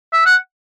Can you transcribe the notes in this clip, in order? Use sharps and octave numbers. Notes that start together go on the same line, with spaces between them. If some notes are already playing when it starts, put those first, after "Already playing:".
E5
F#5